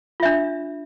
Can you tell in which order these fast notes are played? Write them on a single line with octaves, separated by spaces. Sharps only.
F4 E5 D4